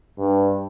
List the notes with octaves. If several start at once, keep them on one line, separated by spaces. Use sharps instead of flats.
G2